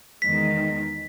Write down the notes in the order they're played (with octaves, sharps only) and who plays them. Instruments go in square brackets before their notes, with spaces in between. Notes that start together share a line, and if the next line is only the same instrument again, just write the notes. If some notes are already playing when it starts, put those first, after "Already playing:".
[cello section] E2 D#3 G#3 [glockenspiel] B6